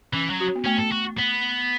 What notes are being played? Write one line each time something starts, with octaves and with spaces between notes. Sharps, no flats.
E3 C#4
F#3
F#4
B3
A3 C#4
A4
F#4
B3